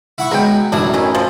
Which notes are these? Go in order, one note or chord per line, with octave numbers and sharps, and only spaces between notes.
E4 F#5 C#6
F#3 G#3 B3 G5
A1 F#2 E3 D4 E4 D#6
D#3 C#4 E4
F3